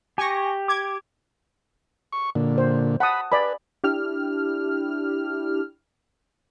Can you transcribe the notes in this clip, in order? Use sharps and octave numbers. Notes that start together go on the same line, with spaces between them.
G4 G#5 C#6 A#6
D6 G#6
C#6
A#2 D3
C5
F#5 A5 B5 D#6
B4 D5 G#5 B5
D4 E4 G4 F6